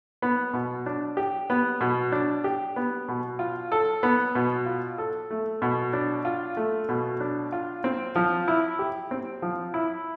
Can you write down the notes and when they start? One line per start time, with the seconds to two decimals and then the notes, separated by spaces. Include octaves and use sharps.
0.22 B3
0.53 B2
0.86 D4
1.17 G4
1.50 B3
1.81 B2
2.12 D4
2.44 G4
2.76 B3
3.08 B2
3.39 F4
3.72 A4
4.03 B3
4.35 B2
4.66 F4
4.98 A4
5.31 A3
5.62 B2
5.93 D4
6.25 F4
6.57 A3
6.89 B2
7.20 D4
7.52 F4
7.84 C4
8.16 F3
8.48 E4
8.79 G4
9.11 C4
9.42 F3
9.74 E4